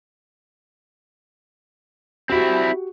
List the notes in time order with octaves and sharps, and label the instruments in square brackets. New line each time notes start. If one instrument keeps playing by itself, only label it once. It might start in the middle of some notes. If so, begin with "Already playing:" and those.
[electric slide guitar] C4 E4 [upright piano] F#4 G4